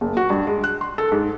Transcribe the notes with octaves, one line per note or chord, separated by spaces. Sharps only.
F#1
F#4
G2
G#3
F#6
C6
A4
G#2